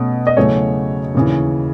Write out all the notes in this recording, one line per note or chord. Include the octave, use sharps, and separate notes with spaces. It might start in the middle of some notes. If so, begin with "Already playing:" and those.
Already playing: B2 A3 C#4
D#5
E2 C#3 F#3 A3 C#4 C#5
D#2 C#3 E3